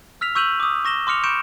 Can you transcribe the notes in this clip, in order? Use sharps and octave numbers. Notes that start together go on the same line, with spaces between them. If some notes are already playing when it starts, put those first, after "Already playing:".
E6 F6 B6 F7
C#6 E6 G6 D#7 F7 F#7
D6 D#6
C#6 A#6 E7 G7
C6 D6 F6 C#7 F7
B5 C#6 G6 C#7 D7 E7